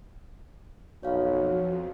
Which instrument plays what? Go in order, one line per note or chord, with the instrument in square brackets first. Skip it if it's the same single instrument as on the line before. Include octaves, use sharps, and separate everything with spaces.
[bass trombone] B1 [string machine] F2 [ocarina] F#4 [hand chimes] C#5 F5